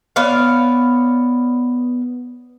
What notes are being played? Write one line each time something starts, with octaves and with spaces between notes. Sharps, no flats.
B3 C#5 D5 F5